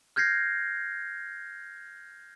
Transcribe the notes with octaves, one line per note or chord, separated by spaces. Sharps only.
F6 G6 G#6 A#6 C7